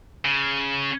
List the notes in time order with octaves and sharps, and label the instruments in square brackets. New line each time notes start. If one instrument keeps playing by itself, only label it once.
[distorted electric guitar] C#3